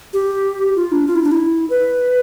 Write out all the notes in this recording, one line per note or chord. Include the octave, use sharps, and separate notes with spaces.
G4
F4
D4
F4
E4
D4
E4
B4